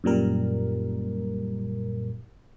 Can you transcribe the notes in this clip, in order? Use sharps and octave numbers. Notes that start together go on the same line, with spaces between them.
F#2 A#2 G3 A#4